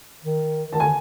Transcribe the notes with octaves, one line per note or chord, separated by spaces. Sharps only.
D#3
D#3 A5
D3 G#5